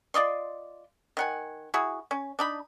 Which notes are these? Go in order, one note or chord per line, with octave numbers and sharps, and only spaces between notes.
F4 D5 D#5 C6
D#3 F#5 G#5
E4 F#4 G#4
C#4
D4 D#4 B5